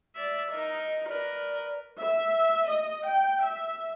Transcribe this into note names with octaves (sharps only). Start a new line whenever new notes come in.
D5 E5
D#4 A#4 D#5
A#4 B4 D5
E5
D#5
G5
E5